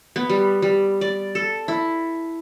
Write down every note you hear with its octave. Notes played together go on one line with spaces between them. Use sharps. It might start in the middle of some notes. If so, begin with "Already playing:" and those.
B3
G3
G3
D5
A4
E4